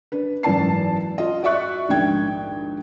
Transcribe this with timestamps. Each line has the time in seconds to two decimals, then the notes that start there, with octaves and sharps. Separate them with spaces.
0.12 D4 B4
0.43 G#1 F#2 E3 D5 A5 C7
1.18 F4 D#5
1.43 F#4 D5 E5 C#6 F#6
1.88 A#1 D#2 G#2 D4 G5 G#6